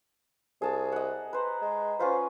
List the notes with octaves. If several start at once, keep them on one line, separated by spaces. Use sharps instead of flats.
C2 G#4 A5
D#5 F#5
B4 C5 A#5
G#3
C#4 F4 B4 C5